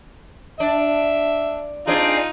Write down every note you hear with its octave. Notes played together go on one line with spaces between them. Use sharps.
D4 E5
C4 D4 D#4 F4 G#4